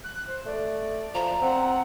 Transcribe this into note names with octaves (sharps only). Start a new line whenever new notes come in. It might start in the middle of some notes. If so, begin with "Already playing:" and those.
F#6
C5
A3 D5
F3 A#5
C4 F#5